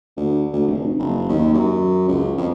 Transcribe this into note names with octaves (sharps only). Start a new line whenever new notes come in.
D2
D2
F1
F#1
D#2
F#2
C#2
F2